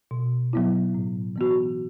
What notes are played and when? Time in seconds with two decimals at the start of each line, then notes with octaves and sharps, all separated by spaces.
0.11 B2
0.53 F#3 B3 E4
0.95 A2
1.36 E3 B3 F#4